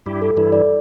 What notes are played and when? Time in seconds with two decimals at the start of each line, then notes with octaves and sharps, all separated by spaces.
0.06 G2 G3 E4 G4
0.22 A4
0.37 G2 E3 G3 E4 A4
0.52 D5